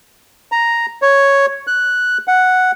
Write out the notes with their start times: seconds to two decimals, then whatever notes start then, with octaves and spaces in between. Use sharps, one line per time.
0.52 A#5
1.02 C#5
1.67 F#6
2.28 F#5